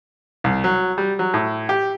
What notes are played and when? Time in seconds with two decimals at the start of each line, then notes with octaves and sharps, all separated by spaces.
0.44 C2
0.64 F#3
0.98 G3
1.19 F#3
1.34 A2
1.69 G4